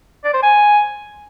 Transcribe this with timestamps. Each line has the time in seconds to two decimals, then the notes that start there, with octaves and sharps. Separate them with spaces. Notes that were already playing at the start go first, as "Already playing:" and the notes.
0.24 D5
0.34 C5
0.43 G#5